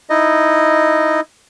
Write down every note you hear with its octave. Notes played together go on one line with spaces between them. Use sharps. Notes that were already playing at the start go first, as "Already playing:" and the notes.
D#4 E4 D#5